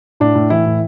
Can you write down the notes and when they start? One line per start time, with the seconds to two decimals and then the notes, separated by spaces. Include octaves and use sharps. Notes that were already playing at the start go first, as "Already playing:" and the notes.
0.20 A2 D4
0.35 A2
0.50 E3 E4
0.65 A2